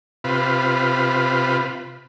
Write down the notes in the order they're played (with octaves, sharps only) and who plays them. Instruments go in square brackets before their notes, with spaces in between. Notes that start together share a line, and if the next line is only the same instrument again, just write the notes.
[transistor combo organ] C3 F4 B4